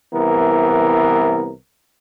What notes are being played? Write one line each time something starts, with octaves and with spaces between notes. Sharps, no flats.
C2 E3 B3 A#4